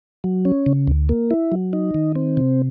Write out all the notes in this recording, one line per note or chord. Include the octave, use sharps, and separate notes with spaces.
F#3
C#4
C#3
D2
A#3
E4
F#3
D#4
D#3
C4
C3